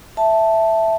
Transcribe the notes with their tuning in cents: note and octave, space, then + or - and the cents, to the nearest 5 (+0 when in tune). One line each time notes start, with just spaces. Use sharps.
E5 +0 A5 +0